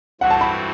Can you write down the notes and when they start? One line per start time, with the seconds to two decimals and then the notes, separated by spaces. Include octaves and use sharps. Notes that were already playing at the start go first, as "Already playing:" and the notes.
0.21 G2 E3 A3 C4 F#4 F#5
0.30 A5
0.41 B5